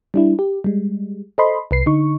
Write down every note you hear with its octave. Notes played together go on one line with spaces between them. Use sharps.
G3 D4 E4
G4
G3 G#3
A4 C5 D#5 B5 C6
C2 B4 C7
D3 D#4 C#6